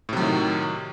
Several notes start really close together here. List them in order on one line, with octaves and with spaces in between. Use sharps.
A2 C3 F#3 D#3